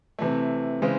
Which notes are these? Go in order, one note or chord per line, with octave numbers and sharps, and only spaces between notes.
C3 E3 A3
C#3 E3 G#3 C4